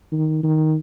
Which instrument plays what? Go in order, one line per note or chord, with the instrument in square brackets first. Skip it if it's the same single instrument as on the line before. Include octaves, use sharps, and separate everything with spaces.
[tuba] D#3
D#3